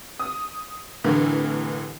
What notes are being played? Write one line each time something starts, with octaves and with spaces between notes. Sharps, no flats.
D#6
C2 A2 D3 E3 A#4